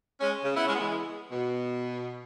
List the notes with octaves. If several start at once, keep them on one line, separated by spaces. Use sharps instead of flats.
G#3 C#4
C#3
B3 E4
G#3 C#4
B3
E3 G#3
B2